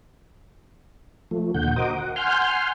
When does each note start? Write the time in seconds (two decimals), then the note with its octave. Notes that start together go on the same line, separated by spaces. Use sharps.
1.31 F3 A3
1.54 D#2 A#2 D3 F#5 G6
1.76 F#4 A#4 C5 D#5 D6 D#6
1.99 F#5
2.16 F#5 G#5 C6 F6 G6